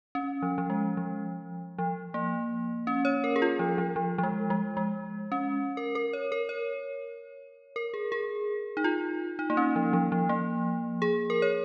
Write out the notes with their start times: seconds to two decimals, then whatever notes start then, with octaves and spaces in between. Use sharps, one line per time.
0.15 C#4
0.42 F3
0.58 F3
0.70 G#3
0.97 F3
1.78 F3
2.14 A#3
2.87 C#4
3.05 C#5
3.24 A#4
3.36 G#4
3.42 F4
3.59 F3
3.78 F3
3.96 F3
4.18 F3
4.23 G#3
4.50 G#3
4.77 G#3
5.32 C#4
5.77 A#4
5.95 A#4
6.13 C#5
6.32 A#4
6.49 C#5
7.76 A#4
7.94 G#4
8.12 G#4
8.77 D#4
8.84 F4
9.39 D#4
9.50 A#3
9.57 C#4
9.76 F3
9.93 F3
10.12 F3
10.29 A#3
11.02 G#4
11.30 A#4
11.42 C#5